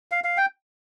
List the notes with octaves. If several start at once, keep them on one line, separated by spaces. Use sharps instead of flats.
F5
F5
G5